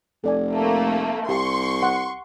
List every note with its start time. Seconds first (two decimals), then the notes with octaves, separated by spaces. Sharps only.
0.24 F1 A4 D5 G#5
0.54 A3 A#3
1.29 C2 G4 C6 C#6
1.83 F#5